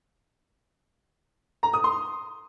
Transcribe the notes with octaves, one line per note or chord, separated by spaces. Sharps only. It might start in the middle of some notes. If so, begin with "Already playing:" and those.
A#5
D#6
C6